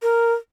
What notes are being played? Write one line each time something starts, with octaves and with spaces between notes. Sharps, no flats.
A#4